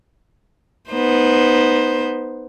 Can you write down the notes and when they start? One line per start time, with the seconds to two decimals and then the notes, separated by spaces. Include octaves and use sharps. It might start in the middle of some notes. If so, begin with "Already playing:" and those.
0.91 B3 D#4 C5